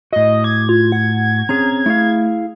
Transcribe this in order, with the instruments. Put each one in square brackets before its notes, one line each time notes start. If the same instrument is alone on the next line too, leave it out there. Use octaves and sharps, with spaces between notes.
[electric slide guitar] A2 F#4 [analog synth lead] D#5
[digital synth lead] D6 [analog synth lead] G#6
[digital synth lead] F4
F#5
[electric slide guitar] C4 C#4 G#4 [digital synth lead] A#5
[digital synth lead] A3 [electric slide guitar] E4 G#4 F5